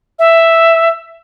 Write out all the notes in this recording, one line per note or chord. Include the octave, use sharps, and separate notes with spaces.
E5